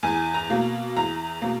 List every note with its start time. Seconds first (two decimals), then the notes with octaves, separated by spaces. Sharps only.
0.03 E2 G#5
0.34 A#5
0.50 B2 A#3
0.96 E2 A#5
1.42 B2 A#3